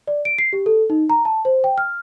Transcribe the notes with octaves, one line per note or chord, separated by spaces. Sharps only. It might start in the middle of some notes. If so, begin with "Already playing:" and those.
D5
D7
C7
G4
A4
D#4
A#5
A5
C5
G5
F6